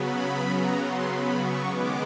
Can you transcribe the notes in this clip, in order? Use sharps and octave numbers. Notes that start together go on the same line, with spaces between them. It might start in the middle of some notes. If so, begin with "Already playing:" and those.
Already playing: C#3 F#3 B3 B5
A#5
C6
B5
C#6
D#3 G#3 B3 D6